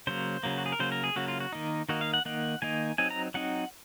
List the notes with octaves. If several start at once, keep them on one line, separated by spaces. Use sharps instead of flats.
C#3 F#3 A#3 C5
C#3 F#3 A#3
F#4
G#4
A#4
C#3 F#3 A#3 C5
A#4
G#4
C#3 F#3 A#3 F#4
F4
F#4
D#3 A#3 D#4
D#3 A#3 D#4 F#4
F5
F#5
D#3 A#3 D#4 F#5
D#3 A#3 D#4 G#5
F#3 C4 D#4 G#5
A#5
F#3 C4 D#4 F#5